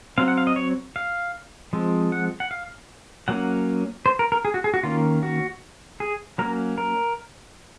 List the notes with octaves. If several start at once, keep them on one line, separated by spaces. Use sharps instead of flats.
F#3 C4 F5
F#5
F5
D#5
C#5
F5
F3 G#3 C4
F#5
F#5
F5
F#3 A#3 C#4 F#5
C5
A#4
A#4
G#4
F#4
G#4
F#4
D#3 A#3 C#4 F4
F#4
G#4
F#3 A#3 C#4 A#4
A#4